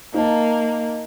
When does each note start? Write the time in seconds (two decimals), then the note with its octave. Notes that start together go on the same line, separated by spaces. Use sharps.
0.14 A#3 D#4 A5